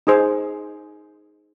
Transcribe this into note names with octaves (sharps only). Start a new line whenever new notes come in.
D#4 G#4 C5